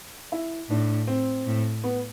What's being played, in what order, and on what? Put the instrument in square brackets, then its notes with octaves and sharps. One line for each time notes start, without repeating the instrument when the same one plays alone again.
[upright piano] E4
[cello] A2 [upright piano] D4
[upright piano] C4
[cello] A2
[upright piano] B3